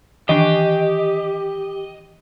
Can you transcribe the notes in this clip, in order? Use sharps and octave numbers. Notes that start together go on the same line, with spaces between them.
D#3 E3 D4 G4 D#5